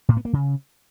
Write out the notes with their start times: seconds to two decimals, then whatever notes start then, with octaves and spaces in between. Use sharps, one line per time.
0.09 A2
0.17 B3
0.25 A#3
0.33 C#3